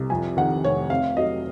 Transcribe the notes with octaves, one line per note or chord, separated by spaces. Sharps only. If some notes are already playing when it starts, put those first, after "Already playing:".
Already playing: C2
F2 G#5
D#3 F#5
F1 C#5
C3 F5
F#3 D#5